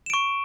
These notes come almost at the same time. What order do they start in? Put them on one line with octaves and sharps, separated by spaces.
E7 D7 C#6